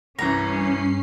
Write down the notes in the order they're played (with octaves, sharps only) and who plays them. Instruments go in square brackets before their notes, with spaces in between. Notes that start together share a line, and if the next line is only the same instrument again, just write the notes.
[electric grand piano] C2 E3 [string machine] G2 C7 [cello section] C#4 [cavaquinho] A#5